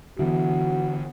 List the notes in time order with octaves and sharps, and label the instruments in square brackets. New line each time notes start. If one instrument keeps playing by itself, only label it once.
[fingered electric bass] D3 B3 [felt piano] E3 [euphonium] F#4